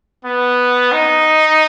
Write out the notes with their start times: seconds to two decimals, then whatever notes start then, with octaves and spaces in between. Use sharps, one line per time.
0.25 B3
0.92 D#4